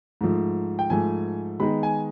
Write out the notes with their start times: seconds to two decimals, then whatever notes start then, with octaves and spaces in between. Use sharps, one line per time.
0.21 G#2 F3 A3
0.79 G5
0.90 G#2 F3 A3 G#5
1.59 D#3 G#3 B3 D#4 B5
1.83 G#5